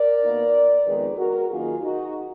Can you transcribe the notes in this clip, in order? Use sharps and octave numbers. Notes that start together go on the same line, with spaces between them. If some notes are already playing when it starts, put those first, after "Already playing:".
Already playing: A#4 D5
B2 A#3 D#4
F2 D#3 G#3 B3 D#4 G#4 B4
F#4 A#4
F#2 D#3 A#3 D#4 F4 G#4
D#4 F#4